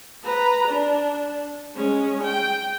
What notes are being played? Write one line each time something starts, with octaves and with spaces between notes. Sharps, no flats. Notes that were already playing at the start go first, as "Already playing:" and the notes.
B4 A#5
D4
G#3 C#4
G5